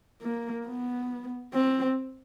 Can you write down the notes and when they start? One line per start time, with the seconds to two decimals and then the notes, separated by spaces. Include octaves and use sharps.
0.22 A#3
0.66 B3
1.54 C4